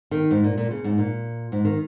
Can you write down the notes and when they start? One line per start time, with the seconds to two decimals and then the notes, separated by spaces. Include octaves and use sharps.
0.11 D#3
0.31 G#2
0.44 A#2
0.57 A#2
0.70 C#3
0.84 G#2
0.98 A#2
1.52 G#2
1.65 D#3